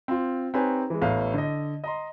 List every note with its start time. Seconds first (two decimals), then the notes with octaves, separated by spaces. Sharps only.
0.08 C4 F4
0.54 C4 D#4 G4 B4 C#5 G#5
0.90 E3 G#3
1.02 A1 A3 B3 F5
1.34 D3 D#5
1.84 D#5 A#5 C6